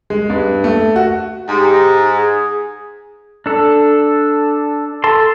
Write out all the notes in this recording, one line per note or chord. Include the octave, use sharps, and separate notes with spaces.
G#3
G2
A3
F#4
G#2 G4
G#4
D4 A4
A4 A5 C6